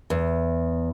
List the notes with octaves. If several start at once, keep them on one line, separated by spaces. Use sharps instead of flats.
E2